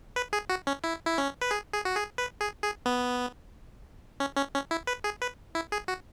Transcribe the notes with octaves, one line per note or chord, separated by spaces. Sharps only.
B4
G#4
F#4
C#4
E4
E4
C#4
B4
G#4
G#4
F#4
G#4
B4
G#4
G#4
B3
C#4
C#4
C#4
E4
B4
G#4
B4
E4
G#4
F#4